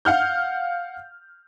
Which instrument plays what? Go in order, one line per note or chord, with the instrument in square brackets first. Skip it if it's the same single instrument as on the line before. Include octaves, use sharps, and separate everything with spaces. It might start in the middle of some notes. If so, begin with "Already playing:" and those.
[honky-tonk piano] F5 F#5 F6 G6